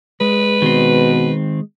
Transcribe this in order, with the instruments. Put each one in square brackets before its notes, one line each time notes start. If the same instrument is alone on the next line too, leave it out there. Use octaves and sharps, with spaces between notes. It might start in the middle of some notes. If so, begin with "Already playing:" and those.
[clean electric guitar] G#3 [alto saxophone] B4
[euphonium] B2 [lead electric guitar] D#3 C4